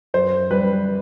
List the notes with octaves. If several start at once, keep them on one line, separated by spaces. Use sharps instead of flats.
F#2 C5
G3 B4